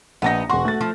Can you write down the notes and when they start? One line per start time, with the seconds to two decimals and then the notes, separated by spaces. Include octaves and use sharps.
0.22 A#1 B3 D4 D#4 A#6
0.50 E1 F#4 C6
0.65 A3 A6
0.81 F3